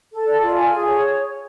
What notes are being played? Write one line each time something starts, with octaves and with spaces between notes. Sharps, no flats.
A4
D5
F4
G#5
G#4
C#5